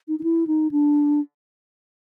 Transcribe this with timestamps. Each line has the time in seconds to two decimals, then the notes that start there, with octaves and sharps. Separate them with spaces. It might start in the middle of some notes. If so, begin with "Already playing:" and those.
0.08 D#4
0.19 D#4
0.23 E4
0.47 D#4
0.71 D4